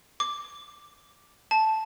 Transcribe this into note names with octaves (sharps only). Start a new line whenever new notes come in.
D6
A5